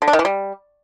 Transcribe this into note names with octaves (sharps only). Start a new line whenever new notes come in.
D3
D4
D#3
E3
G3